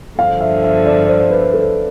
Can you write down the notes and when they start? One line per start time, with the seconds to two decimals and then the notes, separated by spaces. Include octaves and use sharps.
0.18 G2 D3 F3 F5
0.41 E5
0.63 E5
0.86 D5
1.08 C5
1.30 B4
1.53 A4